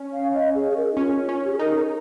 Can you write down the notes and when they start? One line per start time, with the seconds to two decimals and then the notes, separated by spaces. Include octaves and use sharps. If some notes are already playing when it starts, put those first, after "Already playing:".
Already playing: C#4
0.13 F5
0.34 D#5
0.55 G#4
0.70 G#4
0.76 A#4
0.92 D#4
0.97 C#4 F4
1.29 C#4
1.45 G4
1.52 G#4
1.59 D#4 A#4